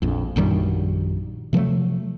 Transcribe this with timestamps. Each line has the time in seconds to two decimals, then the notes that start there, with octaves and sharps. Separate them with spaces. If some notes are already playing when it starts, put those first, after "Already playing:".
0.02 A#1 F2
0.36 A#1 F#2 D#3 G3
1.53 C3 F3 F#3 A3